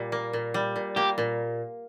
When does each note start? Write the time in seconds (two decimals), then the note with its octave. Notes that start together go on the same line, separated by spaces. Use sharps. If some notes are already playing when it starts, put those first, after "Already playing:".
Already playing: A#2 G3
0.12 A#3
0.33 A#2
0.54 G3
0.76 A#2
0.96 A#3 G4
1.18 A#2